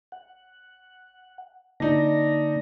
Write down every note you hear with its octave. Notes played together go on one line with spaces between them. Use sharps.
F#5
D3 A#3 D4 D#4 A#6